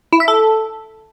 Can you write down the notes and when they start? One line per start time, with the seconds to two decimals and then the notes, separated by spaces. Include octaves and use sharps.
0.13 E4
0.20 E5
0.28 A4